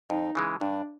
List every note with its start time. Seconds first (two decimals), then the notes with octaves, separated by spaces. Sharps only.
0.10 F2 D#4
0.35 C#3 E3 G#3
0.61 G2 D4